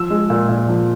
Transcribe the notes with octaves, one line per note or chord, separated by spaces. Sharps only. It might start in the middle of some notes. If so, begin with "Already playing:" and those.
Already playing: F3 E6
G#3
A#2
A#2
F3